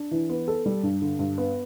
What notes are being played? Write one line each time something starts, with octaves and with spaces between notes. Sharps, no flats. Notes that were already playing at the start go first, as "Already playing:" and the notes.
Already playing: D4
E3
B3
A4
G3
G2
D3
G2
B3